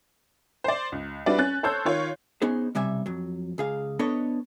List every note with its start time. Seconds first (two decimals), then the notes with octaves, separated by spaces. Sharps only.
0.64 C5 D5
0.92 C#2
1.26 G3 D4 E4 F#4 B4 D5
1.38 C#4 F#6 A6
1.63 A4 C5 C#5 A5 E6 G6
1.85 D#3 F4 C#5
2.42 B3 C#4 D#4 G#4 C5
2.75 B1 C3 G3 E5 G#5
3.06 F2 F#3
3.58 C#2 G#4 F5
3.99 B3 D4 A4 B4 C#5 D#5